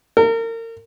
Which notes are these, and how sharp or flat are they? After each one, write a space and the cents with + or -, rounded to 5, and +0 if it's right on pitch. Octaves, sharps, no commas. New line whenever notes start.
A#4 -35